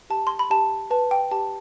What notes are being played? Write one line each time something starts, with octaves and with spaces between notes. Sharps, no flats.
G4 A5
C6
B5
G4 A5
B4 A5
G5
G4 A5